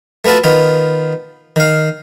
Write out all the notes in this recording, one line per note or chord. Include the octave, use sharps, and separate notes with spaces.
A3 B3 F4 F#4 A4
D#3 B3 F4
D#3 F5